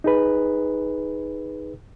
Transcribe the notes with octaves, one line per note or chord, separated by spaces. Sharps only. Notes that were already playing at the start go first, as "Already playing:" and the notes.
D#4 G#4 B4